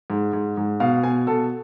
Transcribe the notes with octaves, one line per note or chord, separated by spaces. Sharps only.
G#2
G#2
G#2
B2 F5
B2 G#5
B2 A4